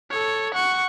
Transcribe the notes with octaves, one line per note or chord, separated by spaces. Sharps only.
A4 C#5
F#5 C#6